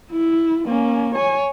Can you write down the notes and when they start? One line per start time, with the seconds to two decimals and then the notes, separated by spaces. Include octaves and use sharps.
0.12 E4
0.66 A#3 C#4
1.14 C#5 G#5